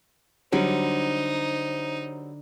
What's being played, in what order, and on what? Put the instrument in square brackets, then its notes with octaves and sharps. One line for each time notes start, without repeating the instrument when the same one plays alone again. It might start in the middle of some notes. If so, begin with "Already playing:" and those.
[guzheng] D3 [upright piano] F#3 G3 [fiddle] D#4 [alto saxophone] C5